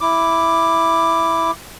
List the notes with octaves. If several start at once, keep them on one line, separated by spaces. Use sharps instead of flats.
E4 D6